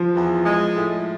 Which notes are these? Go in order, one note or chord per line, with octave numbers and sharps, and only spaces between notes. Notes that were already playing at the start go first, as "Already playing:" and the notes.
Already playing: F3
E2
G#3
A2